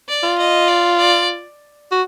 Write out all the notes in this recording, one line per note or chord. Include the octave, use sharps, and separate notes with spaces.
D5
F4
D#5
D5
D5
F#4